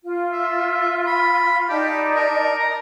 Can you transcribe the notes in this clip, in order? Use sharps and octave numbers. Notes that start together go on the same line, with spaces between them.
F4
E5
B5
D#4 G4 D5 A5
A#4
A#5